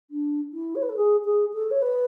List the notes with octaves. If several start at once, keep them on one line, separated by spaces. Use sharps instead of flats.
D4
E4
C#5
B4
A4
G#4
G#4
A4
C#5
B4